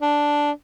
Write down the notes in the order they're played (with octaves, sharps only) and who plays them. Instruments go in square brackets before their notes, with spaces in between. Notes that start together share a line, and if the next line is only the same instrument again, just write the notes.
[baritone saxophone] D4